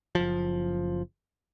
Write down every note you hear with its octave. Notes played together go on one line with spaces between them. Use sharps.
F#1 F3